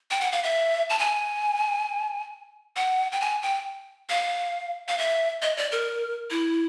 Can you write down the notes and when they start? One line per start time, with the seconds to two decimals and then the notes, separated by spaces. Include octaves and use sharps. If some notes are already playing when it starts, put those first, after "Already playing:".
0.11 G5
0.21 F#5
0.32 F5
0.44 E5
0.90 A5
0.99 G#5
2.76 F#5
3.12 G5
3.21 G#5
3.42 G5
4.09 F5
4.88 F5
4.98 E5
5.42 D#5
5.57 D5
5.72 A#4
6.30 E4